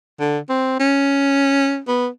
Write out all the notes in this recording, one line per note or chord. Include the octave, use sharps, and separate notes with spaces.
D3
C4
C#4
B3